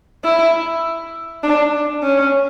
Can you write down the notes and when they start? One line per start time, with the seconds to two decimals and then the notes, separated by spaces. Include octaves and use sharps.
0.24 E4
1.43 D4
2.03 C#4